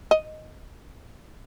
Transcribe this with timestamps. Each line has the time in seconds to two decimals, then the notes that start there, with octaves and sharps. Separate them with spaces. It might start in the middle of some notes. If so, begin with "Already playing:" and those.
0.11 D#5